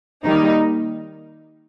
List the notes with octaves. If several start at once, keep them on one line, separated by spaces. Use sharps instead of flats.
D#3 G3 A#3 D#4